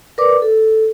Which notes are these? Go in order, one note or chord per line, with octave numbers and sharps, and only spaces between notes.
A#4 B4 D5 D6
A4